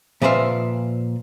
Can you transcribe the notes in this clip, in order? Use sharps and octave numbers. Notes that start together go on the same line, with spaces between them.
A#2 F3 B4 C5 E5 F5